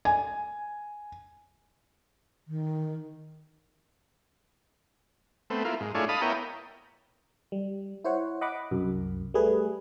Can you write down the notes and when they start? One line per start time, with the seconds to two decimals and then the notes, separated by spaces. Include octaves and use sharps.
0.05 G#5
2.48 D#3
5.50 A3 B3 C4
5.65 A#3 E4 F4
5.80 G#2
5.95 A3 D4 E4 F4 G#4 C#5
6.09 D#5 F5 A5 B5 D#6
6.21 B3 E4 A#4 C#5 G5
7.52 G3
8.04 E4 C5 C#5 F#5
8.41 D#5 F#5 B5 D6
8.71 C2 F#2
9.34 G3 A3 G#4 B4